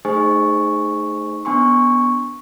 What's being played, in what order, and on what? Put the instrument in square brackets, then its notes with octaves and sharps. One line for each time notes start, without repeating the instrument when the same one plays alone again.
[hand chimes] A3 D#4 G#4 C5 G#5 C#6
B3 D4 G#5 C6 C#6